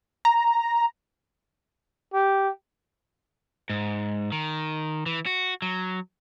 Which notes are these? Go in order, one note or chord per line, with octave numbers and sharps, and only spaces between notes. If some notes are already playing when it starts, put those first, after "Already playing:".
A#5
G4
G#2
D#3
E3
F#4
F#3